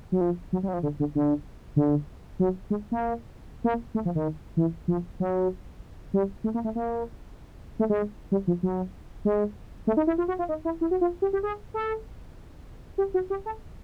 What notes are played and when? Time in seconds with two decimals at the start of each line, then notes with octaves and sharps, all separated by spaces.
0.12 F#3
0.21 F3
0.53 F#3
0.63 G3
0.68 F#3
0.74 F3
0.83 D3
1.00 D3
1.15 D3
1.76 D3
2.39 F#3
2.70 G#3
2.92 A#3
3.64 A#3
3.95 A3
4.05 F3
4.15 D#3
4.57 E3
4.88 F3
5.20 F#3
6.14 G3
6.44 A3
6.54 A#3
6.64 A3
6.75 A#3
7.79 A3
7.90 G#3
8.32 G3
8.47 F3
8.63 F#3
9.25 G#3
9.87 A3
9.97 D#4
10.07 E4
10.18 F4
10.28 F#4
10.39 F4
10.49 D#4
10.65 E4
10.81 E4
10.91 F#4
11.01 F4
11.22 G4
11.33 G4
11.43 G#4
11.74 A4
12.98 G4
13.14 F#4
13.30 G4
13.46 A4